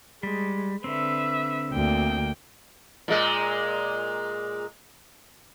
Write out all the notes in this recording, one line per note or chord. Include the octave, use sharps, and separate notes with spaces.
G3 G#3
D3 C4 B4 E5
D2 A#3 G5
A#2 G#3